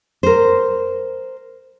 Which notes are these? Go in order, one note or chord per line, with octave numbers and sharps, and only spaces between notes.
A#4 C5